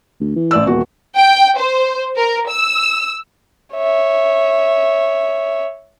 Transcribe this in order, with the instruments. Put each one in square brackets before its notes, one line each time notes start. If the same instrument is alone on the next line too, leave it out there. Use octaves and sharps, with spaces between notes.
[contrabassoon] D2
E3
[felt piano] A1 D5 E6
[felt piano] D#1 F#4 [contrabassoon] E2
[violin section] G5
C5
A#4
E6
[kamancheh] C#5 E5